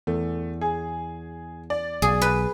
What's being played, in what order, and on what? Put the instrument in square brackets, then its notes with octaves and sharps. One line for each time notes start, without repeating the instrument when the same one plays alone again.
[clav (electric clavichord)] E2 [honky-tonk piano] A3
[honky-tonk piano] G#4
D5
[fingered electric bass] B1 [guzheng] G#4
[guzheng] B4